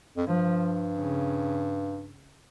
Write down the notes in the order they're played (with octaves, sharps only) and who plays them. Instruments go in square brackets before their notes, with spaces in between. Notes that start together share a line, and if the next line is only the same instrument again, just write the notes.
[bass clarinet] F2
[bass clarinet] G2 [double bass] F3
[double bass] C#3